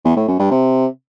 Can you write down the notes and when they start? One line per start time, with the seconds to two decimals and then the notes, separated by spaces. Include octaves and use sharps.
0.05 E2
0.16 A2
0.28 F#2
0.39 G2
0.51 C3